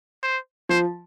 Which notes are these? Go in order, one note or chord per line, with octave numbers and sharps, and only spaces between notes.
C5
F3 C5